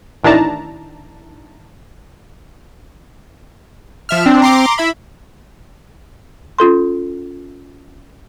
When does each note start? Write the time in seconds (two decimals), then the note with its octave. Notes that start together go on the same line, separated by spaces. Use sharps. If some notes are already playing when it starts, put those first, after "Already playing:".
0.24 A1 D#3 D4 E4 A5 A#5
4.09 F3 E5 F6
4.26 C4 D4
4.42 A#5 C6 D6
4.78 E4 E5 B5
6.59 C#4 F4 A4 C6